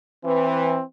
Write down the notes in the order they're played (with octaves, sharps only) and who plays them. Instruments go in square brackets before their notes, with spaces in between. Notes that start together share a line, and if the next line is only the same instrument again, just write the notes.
[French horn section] E3 [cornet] C4